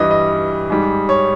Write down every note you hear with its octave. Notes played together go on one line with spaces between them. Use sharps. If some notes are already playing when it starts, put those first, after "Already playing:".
Already playing: G2 E3 G3 D#5
D#5
G#2 G3
C#5